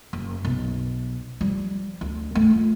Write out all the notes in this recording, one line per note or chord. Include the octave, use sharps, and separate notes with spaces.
F#1
B1
F3 G3
D2
A3
F4